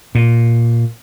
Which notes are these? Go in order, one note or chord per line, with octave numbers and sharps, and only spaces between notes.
A#2